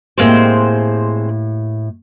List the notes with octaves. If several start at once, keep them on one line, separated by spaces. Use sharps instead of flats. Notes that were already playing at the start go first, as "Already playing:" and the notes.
A2 G#3 A#3 C4 G4 C5